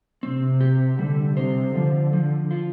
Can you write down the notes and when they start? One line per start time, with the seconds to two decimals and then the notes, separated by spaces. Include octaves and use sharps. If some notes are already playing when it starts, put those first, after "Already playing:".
0.23 C3 C4
0.61 G4
0.99 D3 G3
1.37 C3 C5
1.75 D3 F3
2.13 F3
2.51 F4